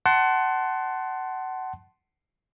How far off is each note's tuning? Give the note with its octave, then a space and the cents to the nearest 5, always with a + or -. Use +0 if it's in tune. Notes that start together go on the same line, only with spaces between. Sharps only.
F#5 +25 A5 +0 C6 +0